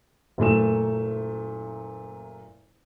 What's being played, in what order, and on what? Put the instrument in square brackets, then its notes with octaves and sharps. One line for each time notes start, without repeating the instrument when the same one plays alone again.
[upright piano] F#1 A#2 A3 E7